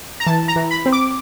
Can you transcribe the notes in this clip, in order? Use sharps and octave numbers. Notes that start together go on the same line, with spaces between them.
A#5
E3 A5
A#5
E3
B5
C4
D6